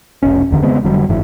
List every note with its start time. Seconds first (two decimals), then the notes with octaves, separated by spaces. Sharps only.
0.23 F1 B1 C#4
0.51 F1 E2 D3 D#3
0.63 C#3 G#3 B3 C4
0.83 F1 D3 F#3 G3
1.09 F#1 G#2 E3